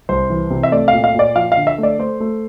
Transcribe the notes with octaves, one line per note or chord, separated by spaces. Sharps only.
C2 C5
E3
C3
E5
A3 D5
A#2 F5
F5
A#2
D5
F3 F5
F5
D3
E5
A3
D5
A3 C5
A3